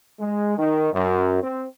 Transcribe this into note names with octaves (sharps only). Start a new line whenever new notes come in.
G#3
D#3
F#2
C4